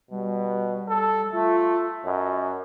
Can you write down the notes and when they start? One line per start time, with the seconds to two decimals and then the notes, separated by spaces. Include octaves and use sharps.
0.11 B2 G3
0.89 A4
1.32 A3 F4
2.06 F#2 D#5